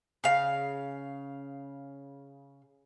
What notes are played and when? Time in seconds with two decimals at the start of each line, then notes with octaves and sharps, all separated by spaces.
0.24 C#3 F5